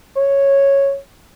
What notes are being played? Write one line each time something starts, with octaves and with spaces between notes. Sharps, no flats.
C#5